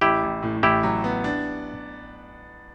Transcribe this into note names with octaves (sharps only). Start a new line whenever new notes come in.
A1 E4 G4
A1
A2
A1 E4 G4
F#3
B3
D4